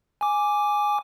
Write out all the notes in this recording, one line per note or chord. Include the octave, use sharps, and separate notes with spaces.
G#5 D6